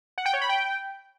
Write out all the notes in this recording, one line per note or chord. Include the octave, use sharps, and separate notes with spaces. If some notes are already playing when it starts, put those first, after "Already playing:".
F#5
G5
C#5
B5
G5